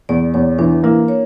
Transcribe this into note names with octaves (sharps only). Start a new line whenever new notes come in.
E2 D5
E2 C#5
E3 D4
A#3 E4
C#5